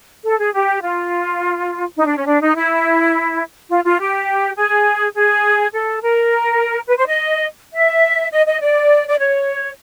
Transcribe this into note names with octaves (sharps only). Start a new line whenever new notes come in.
A4
G#4
G4
F4
D#4
D4
C#4
D4
D#4
E4
F4
F4
G4
G#4
G#4
A4
A#4
B4
C5
D#5
E5
D#5
D#5
D5
D5
C#5